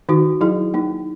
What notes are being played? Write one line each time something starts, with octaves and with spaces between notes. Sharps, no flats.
D#3 D#4 F#4
F#3 E4 G#4
A#3 D#4